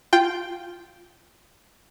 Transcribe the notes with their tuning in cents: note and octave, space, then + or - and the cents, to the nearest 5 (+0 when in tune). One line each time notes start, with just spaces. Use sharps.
F4 -5 G5 +0